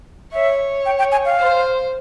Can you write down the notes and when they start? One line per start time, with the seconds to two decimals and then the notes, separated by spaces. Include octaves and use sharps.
0.33 C#5 E5
0.86 G5
0.99 G5
1.12 G#5
1.25 F5
1.39 C5